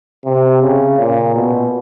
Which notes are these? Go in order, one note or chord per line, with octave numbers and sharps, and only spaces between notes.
C3
C#3
A#2
B2